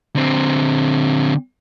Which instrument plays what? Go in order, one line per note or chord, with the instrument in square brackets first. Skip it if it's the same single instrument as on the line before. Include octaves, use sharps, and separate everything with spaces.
[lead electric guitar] D3 C4